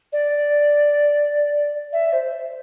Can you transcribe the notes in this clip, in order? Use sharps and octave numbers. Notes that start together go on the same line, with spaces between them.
D5
E5
C5